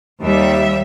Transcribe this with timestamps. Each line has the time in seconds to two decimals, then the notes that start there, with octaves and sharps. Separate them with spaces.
0.22 D#2 G3 E5